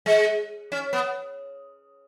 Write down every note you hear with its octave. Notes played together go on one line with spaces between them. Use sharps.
G#3
C#4
B3